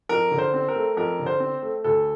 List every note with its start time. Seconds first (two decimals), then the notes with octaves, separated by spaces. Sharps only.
0.09 F2 A#4
0.31 D3
0.38 C5
0.54 C4
0.68 A#4
0.75 A3
0.97 F2 A#4
1.19 D3
1.26 C5
1.40 C4
1.62 A3
1.84 D2 A4